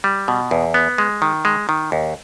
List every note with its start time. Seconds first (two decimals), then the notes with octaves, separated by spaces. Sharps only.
0.04 G3
0.28 B2
0.51 E2
0.74 B3
0.98 G#3
1.22 D#3
1.45 G#3
1.69 D#3
1.92 D#2